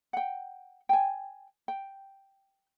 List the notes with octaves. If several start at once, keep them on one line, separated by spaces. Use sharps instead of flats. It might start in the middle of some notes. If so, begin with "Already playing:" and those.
F#5 G5
G5 G#5
G5